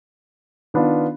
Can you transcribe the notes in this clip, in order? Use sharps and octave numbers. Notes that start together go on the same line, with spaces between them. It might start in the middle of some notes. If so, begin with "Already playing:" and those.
D#3 B3 D4 F4